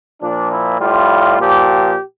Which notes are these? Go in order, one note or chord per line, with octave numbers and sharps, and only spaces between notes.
A#2 F3 D4
E4
A2 G3 F4
A#2 F3 G4